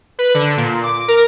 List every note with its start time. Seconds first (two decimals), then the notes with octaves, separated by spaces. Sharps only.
0.19 B4
0.34 D3
0.57 A#2
0.84 D6
1.08 A#4